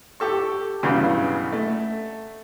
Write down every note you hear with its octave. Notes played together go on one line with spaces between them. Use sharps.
G4 A4 C#6
B1 G2 C#3 E3
A3